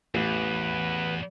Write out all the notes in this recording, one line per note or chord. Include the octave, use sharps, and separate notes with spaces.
A1 E2 B4